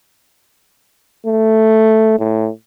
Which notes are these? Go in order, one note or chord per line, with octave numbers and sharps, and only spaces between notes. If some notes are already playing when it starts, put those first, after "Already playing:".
A3
A2